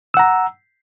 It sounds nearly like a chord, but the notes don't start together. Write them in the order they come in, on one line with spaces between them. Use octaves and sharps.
E6 F#5 A#5